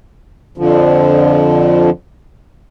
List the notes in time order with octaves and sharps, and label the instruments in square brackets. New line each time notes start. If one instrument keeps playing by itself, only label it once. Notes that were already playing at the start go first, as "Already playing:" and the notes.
[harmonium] F2 D3 F3